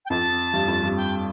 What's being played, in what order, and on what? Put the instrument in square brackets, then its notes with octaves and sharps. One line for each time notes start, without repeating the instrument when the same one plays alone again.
[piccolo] G5
[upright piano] F2 [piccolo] A5
[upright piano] G2
F2
G2
[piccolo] G5